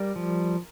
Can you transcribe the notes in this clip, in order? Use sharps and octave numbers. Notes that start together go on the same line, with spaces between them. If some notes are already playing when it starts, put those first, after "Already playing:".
Already playing: G3 A#4 D5
F3